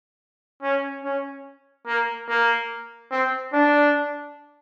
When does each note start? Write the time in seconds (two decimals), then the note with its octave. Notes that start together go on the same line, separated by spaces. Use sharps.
0.63 C#4
1.04 C#4
1.87 A#3
2.28 A#3
3.12 C4
3.53 D4